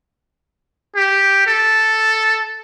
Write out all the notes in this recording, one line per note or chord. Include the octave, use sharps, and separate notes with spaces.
G4
A4